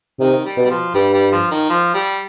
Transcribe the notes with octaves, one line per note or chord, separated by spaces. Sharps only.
C3 D#3
G3
B2
G3
F3
G2 G3
G3
F3
D#3
F3
G3